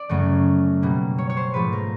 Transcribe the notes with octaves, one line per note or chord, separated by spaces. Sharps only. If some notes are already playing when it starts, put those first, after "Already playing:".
Already playing: D5
F#2 C#3 F#3 A3
B2 G3 A#3
C#5
C#5
C5
G#2 F3 A3 B4
A#4